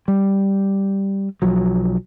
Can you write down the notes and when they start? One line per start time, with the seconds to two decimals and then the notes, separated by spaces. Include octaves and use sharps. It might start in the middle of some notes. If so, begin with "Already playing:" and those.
0.08 G3
1.42 B1 F3 F#3